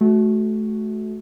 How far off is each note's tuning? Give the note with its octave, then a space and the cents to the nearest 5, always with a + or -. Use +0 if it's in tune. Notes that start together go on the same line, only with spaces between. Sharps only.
A3 -30 F#4 +0